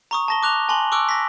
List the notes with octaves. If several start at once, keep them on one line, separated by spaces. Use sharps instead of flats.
A#5 C#6 D#6
A5 A#6 G7
D6 F#6 F7 G7
G#5 A5 C6 F#7 G7
C#6 D6 E6 F#6 D7
A#6 B6